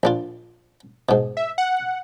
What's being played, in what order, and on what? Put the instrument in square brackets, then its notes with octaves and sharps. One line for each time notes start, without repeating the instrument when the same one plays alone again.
[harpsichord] A#1 D4 F4
G#2 B2
[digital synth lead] E5
F#5